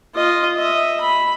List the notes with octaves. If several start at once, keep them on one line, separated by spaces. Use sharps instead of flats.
F4 D#5
D#5 E5
B5